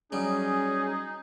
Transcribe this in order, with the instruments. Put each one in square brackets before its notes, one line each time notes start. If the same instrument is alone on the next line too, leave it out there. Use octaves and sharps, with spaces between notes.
[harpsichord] F#3 G3 [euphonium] C#4 [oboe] D#4 [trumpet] G#4